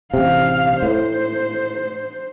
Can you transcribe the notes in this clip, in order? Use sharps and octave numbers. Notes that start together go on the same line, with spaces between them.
A1 C3 F5
A2 C5